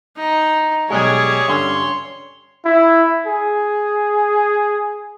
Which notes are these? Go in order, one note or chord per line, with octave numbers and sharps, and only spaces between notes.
D#4
B1 G3 G#3 G#4 C#5
G2 D3 C#4 C6
E4
G#4